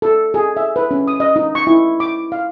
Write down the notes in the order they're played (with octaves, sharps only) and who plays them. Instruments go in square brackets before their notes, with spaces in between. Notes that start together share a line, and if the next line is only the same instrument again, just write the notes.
[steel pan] A4
G#4
E5
B4
C#4
D#6
D#5
D#4
C#6
E4
D6
F5